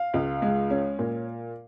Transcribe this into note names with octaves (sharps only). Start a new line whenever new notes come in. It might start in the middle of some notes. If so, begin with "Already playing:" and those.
Already playing: F5
C#2
G#3
C#4
A#2